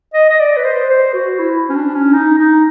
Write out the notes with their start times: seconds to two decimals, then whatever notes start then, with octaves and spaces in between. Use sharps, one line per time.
0.14 D#5
0.30 D#5
0.40 D5
0.57 B4
0.64 C5
0.89 C5
1.14 F#4
1.39 E4
1.70 C#4
1.76 D4
1.95 C#4
2.13 D#4
2.38 D#4